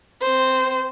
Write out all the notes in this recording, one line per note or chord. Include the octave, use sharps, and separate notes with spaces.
C4 C5